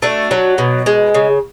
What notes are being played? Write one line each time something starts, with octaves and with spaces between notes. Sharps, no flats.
A3 D4 F#4
F#3
B2
G#3
C#3